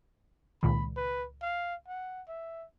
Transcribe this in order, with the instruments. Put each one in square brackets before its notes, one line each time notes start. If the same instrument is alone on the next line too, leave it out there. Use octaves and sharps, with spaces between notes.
[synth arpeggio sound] C#2 A#2 D#3 [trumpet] B5
[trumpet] B4
F5
F#5
E5